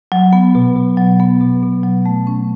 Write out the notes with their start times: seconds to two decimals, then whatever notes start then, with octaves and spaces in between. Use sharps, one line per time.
0.12 F#3
0.33 B3
0.55 B2
0.76 B2
0.97 F#3
1.20 B3
1.41 B2
1.63 B2
1.84 F#3
2.06 A3
2.27 C#4